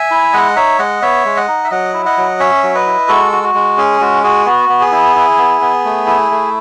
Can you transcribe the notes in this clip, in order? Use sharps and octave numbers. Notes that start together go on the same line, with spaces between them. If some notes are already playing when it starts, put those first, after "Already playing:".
Already playing: E5 G#5
E4
G#3 D#5 F#5
D#4 C#5 E5
G#3 D#5 F#5
B3 C#5 E5
G#3
D#5 F#5
D#4
E5
F#3 D#5 F#5
E4
D#5 F#5
F#3
C#4 C#5 E5
F#3
B4 D#5
E4
G#3 F#4 A4
F#4
F#4
G#3
C#4 G#4
G#3 F#4
F#4 G#4
B3 F#4
B3
G#4
E4
E4
B3
B3
A3
E4
A3